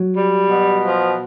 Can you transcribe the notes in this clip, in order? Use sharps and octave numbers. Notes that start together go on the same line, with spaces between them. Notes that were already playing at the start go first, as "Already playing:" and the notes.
Already playing: F#3
G3
B2
F3